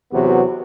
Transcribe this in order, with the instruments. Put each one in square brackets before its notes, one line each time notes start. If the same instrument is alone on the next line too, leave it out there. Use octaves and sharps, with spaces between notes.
[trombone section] E2 C3 F#3 B3 F#4